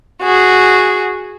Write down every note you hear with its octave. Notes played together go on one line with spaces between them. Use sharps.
F#4 G#4